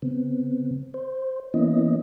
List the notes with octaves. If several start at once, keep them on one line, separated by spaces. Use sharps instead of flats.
C#3 B3 C4
C5
E3 A#3 B3 C#4 E4 D#5